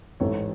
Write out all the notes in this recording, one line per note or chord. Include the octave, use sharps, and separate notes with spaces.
A1 G#2 E3 A4 C#5